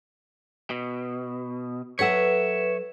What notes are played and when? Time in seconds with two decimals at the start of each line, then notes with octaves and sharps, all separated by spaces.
0.70 B2
1.99 F#3 A4 B4 C#5 E5 F#5